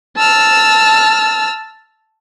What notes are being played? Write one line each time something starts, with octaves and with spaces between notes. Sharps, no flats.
A5 E6 F6